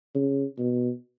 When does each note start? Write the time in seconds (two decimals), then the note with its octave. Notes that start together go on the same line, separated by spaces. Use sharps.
0.15 C#3
0.59 B2